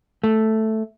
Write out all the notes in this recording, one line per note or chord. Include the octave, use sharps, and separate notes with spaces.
A3